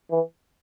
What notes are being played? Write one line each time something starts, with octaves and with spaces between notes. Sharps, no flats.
E3